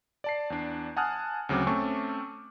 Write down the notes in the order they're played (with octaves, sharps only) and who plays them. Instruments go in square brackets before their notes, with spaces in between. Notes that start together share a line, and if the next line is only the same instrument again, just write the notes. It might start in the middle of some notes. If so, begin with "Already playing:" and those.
[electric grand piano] D5 A5 C7
E2 D4
F#5 G#5 A5 D#6 F6 F#6
D2 C#3 F#3 C4 D6
A3 C4 C#4 A5 C#6